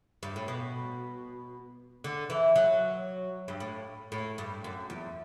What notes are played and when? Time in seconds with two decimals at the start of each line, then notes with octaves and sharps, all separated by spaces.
0.23 G2
0.36 A2
0.48 B2
2.04 D3
2.30 E3
2.56 F#3
3.48 G2
3.60 A2
4.12 A2
4.38 G2
4.64 F#2
4.90 E2